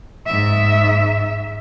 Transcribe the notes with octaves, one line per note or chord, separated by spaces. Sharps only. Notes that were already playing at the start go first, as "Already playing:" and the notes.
G#2 E5